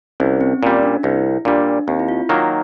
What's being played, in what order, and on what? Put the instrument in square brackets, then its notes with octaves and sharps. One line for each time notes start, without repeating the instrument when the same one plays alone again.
[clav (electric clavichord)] C2 [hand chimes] C#4
[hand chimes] C4
[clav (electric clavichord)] A#2 G3 [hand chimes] C#4
[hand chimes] D4
[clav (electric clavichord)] C2 [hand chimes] E4
[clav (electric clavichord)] A#2 G3 [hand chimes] D4
[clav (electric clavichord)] D#2 [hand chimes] C4
[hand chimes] E4
F4
[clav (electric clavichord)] D#3 F#3 A#3 [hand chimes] D#4